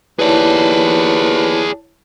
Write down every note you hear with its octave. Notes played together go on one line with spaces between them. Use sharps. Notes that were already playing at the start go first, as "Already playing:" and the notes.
D#2 E4 G#4 B4 C#5 D5 A5